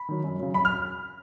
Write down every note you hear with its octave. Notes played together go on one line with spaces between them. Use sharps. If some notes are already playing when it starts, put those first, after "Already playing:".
Already playing: B5
D#3 F#3
F#2
C#3 F#3
F#2 B5
F6